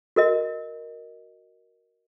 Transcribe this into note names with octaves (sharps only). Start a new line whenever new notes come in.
F#4 A#4 D#5